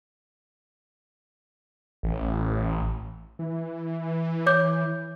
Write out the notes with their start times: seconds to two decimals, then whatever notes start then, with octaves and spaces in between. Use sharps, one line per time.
2.03 A1
3.39 E3
4.46 C#5 D6 G6